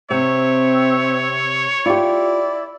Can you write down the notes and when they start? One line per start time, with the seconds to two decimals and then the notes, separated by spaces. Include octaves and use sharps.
0.10 C3 C4 C#5 E5
1.86 E4 F4 G4 D5